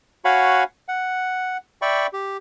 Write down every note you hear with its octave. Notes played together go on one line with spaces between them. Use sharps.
F#4 C#5 F5 F#5 G#5 B5
F#5
D5 E5 G5 B5 C#6
G4